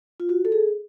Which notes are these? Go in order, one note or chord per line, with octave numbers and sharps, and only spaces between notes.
F4
F#4
A4
G#4